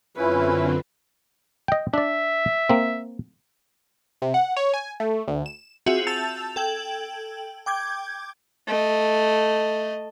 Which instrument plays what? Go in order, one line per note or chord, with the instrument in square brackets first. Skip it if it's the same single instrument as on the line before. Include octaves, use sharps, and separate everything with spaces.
[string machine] F#2 D3 C4 [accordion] C#4 E4 [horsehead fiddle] F4 B4
[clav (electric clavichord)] D#5 G5
[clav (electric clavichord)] D4 D5 [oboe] E5
[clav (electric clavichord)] A#3 C4
[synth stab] C3
F#5
C#5
G#5
A3
D2
E7
[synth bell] C4 F4 F#4 G#4 E5
A5 E6 G6 A6 F7
A4 G5 G#6 F#7
G5 D6 G6 G#6
[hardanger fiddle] A3 D#5